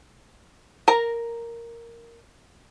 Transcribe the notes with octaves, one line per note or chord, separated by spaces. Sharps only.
A#4 A#5